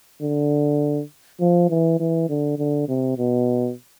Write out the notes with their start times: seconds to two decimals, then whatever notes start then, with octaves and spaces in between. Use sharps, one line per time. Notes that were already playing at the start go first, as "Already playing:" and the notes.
0.22 D3
1.41 F3
1.70 E3
2.00 E3
2.29 D3
2.59 D3
2.88 C3
3.18 B2